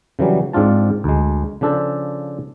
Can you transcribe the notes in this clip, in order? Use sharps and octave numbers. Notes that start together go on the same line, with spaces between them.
C#3 E3 F#3 G3
G#2 C4 D4 F4 A5
D2 G#3
C#3 F3 D4 A4 C5 A5